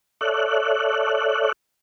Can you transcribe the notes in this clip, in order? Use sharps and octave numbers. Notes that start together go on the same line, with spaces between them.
A4 C#5 D5 E5 F#6